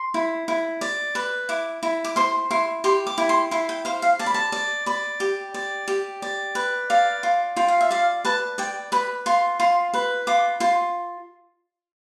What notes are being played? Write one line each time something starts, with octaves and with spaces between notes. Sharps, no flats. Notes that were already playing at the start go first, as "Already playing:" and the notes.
Already playing: C6
E4
E4
D5
B4
E4 D6
E4
D6
C5 C6
E4 C6
G4 C6
D6
E4
C6
E4 C6
G5
C5 F5
F5
D5 A5
B5
A5
D5
D5 B5
G4
D5
G4
D5
B4
D5 F5
F4
F4 G5
F5
E5
D5 F5
B4 A5
D5 G5
B4 B5
F4 C6
F4 C6
B4
F4 D6
F4 C6